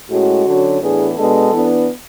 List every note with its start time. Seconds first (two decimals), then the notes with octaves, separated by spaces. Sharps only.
0.09 A2 G#3 C#4 F#4
0.45 D3 F#3 C#4
0.80 A2 E3 B3 D4 G#4
1.16 B2 G#3 B3 D4 A4
1.52 E3 B3 D4